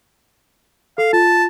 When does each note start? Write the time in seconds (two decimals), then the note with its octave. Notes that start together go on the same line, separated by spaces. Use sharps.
0.98 A4 F5
1.13 F4 A5